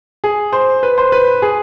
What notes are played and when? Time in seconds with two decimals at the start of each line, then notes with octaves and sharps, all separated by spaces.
0.24 G#4
0.52 C5
0.83 B4
0.98 C5
1.12 B4
1.42 G#4